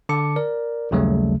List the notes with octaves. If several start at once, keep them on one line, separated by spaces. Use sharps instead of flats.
D3 A5 D6 C#7
A#4 D5
A#1 D#2 C#3 F#3 G3 A3